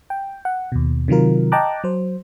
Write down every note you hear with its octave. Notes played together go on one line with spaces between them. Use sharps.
G5
F#5
D#2 B2
C3 D#3 F#3 F4 A#4
D#5 G5 A5 A#5 D6 F#6
F#3 C5